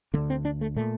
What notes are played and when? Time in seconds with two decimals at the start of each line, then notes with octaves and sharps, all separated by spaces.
0.14 D3 A#3
0.17 D2
0.30 C4
0.45 D4
0.61 A3
0.76 A#2 A3